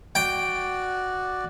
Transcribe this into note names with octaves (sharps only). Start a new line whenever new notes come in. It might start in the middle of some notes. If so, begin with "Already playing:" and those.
F#4 D5 G5